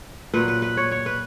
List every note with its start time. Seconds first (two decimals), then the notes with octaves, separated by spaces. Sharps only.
0.34 A#2 F#3 B4
0.48 B4
0.62 B4
0.77 C#5
0.91 C#5
1.06 B4